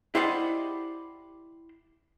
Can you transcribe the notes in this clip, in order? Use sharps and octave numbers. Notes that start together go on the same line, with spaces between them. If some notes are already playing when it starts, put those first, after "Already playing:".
E4 G4 C5 D5 D#5 F#5